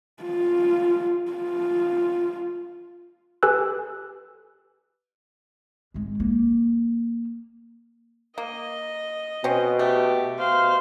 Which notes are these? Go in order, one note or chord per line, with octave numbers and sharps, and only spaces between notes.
F4
F4
G4 A4 B4 G#5 E6 F#6
G#1 G#3
A#3
A#3 D#5
B2 C4 C#4
A3 G4
B2 C5 F5